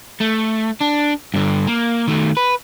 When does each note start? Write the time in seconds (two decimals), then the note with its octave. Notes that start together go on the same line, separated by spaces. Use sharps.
0.20 A3
0.80 D4
1.34 G2 D3
1.67 A#3
2.08 D#3 A3
2.37 B4